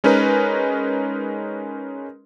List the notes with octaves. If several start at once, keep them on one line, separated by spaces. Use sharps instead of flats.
G#3 C#4 D#4 A#4 B4